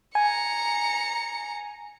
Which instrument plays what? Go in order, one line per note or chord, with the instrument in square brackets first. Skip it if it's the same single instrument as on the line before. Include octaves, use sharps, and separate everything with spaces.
[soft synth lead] G#5 [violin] A#5 C#7